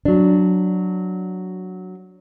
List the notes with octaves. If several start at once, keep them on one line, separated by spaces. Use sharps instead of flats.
F#3 D4